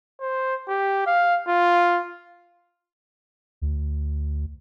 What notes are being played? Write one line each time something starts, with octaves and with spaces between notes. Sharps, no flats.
C5
G4
F5
F4
D2